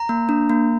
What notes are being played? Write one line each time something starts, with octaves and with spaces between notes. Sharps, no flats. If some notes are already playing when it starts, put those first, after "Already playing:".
Already playing: A#5
A#3
D4
A#3